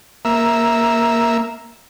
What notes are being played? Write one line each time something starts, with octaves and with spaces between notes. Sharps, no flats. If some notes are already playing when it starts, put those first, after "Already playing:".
A#3 E5